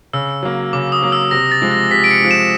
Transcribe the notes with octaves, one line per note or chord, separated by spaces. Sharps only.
C#3 E6
F#3 A#3
C#3 D6
D#6
F#3 A#3
E6
C3 A#6
A6
F3 G#3
A#6
C3 B6
D7
C#7
F3 G#3
E7